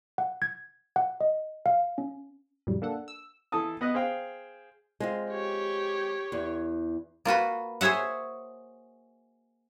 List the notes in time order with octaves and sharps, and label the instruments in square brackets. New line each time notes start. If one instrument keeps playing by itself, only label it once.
[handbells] F#5
G#6
F#5
D#5
F5
C#4
[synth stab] F2 A2 C#3 F#3 G3
A#3 D4 A4 F#5
E6
[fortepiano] E3 A4 A5 D#6
B3 D#5 F#6
G#4 C5 F5 G5
[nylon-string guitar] G#3 C4 F4
[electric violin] G4 C#5
[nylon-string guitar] E2
[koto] A#3 F4 F#4 B4
G#4 C5 C#5 E5 F#5